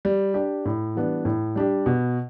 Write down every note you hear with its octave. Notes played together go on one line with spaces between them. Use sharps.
G3
D4 G4
A2
E3 G3 B3 D4
A2
G3 D4 G4
B2